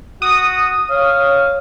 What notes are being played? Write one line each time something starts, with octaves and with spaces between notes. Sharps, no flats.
F#4 D#6
C#5 F5